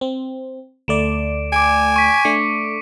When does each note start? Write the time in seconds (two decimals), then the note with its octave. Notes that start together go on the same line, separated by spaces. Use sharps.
0.01 C4
0.88 D2 A3 D5 D7 E7
1.53 G#5 D6 D7
1.96 C#6 B6
2.25 A3 D4 C#7